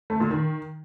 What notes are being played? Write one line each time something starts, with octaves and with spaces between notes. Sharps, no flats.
A3
A#2
D#3